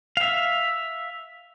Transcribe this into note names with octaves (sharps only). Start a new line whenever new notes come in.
E5 F5